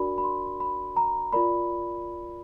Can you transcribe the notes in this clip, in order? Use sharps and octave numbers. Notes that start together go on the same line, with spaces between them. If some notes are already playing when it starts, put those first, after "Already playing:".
Already playing: D4 F#4 A#4 D5 B5
B5
C6
B5
A#5
F4 A#4 D5 B5